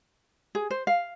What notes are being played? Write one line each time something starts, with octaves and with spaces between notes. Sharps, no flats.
G#4
C5
F5